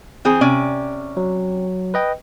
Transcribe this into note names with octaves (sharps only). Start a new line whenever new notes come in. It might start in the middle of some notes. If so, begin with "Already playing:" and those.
E3 C4 G#4
C3 C#4 D5
F#3
B4 D#5 G5